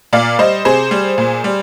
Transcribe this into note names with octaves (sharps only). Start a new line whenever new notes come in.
A#2 D5 F5
G3 C5 D#5
C3 G#4 C5
G3
A#2
G3